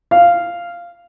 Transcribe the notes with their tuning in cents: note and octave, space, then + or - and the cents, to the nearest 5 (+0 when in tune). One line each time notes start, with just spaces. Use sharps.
F5 -10